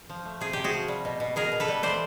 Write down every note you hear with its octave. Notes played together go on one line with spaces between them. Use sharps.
F3
A3
C3 G#4
C3 G4
F#4 G#4
F3
G3
B2
B2
B2 G#4 A#4
B2
A4 B4
G3
E3 C5 D5